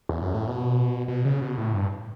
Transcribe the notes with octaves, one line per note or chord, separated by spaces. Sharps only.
E2
F#2
A2
B2
B2
C#3
B2
A2
G2